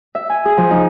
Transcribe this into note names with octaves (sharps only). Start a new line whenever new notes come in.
E5
G#5
G#4
F3
D#4